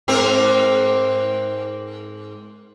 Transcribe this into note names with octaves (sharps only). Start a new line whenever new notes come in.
G#2 C4 A#4